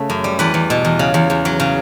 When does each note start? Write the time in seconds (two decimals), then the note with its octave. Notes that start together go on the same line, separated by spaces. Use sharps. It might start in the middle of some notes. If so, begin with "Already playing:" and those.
Already playing: C#3 A3
0.10 F#2
0.24 G3
0.39 E2 B4
0.54 E2
0.70 B2
0.85 E2
0.99 C#3
1.14 E2
1.30 E2
1.45 F#3
1.60 C#3